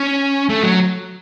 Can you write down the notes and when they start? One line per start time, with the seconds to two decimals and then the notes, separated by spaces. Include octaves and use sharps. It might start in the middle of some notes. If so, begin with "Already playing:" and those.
Already playing: C#4
0.49 A3
0.63 F#3